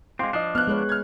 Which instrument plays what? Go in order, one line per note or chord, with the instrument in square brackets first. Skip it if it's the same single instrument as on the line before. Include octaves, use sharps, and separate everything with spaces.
[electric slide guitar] G#3 C4 [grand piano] F5 C6 D6
[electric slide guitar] F3 D4 [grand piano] D#5 D#6 C7
[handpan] B3 [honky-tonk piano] F6 F#6
[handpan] G#3 B4 C#5
[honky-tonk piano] F6 G#6